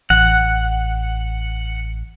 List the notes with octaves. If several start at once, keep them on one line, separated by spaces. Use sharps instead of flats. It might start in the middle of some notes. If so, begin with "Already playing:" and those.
A1 F#5